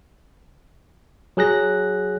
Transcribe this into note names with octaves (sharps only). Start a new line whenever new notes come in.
F#3 G#4 F#6 A#6